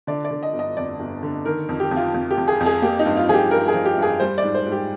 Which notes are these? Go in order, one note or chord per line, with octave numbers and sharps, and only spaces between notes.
D3 D5
D5
D3
D#5
G1
D#5
F2 D5
G1
D3
D#3 A#4
F2
G4
F2
F4
F2
G4
F2
G#4
F2
G#4
A#3 G4
D#4
G2
F4
F3 G#4
G4
G2 A#4
G#4
F3
G4
G2 G#4
G3 C5
D5
G#2
C5
G#2
G4